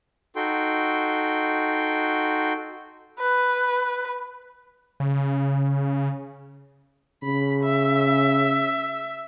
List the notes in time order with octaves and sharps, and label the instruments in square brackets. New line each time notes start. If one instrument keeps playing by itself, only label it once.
[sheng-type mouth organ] D#4 F#4 A4 G5 C6
[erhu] B4
[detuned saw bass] C#3
[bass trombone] C#3 [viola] B5
[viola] E5